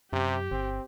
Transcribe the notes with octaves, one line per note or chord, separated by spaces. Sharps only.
F#2 C3 G4
G1 C4